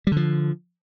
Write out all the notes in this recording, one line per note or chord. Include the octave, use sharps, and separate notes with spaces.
D3 F3 G3